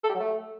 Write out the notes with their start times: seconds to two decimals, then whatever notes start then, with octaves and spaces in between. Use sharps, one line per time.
0.04 A4
0.09 G4
0.15 F#3
0.20 A3